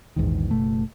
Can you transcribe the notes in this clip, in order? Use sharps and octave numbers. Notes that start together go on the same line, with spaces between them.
A#1 E2 G#2 D#3
F#1 B2 A3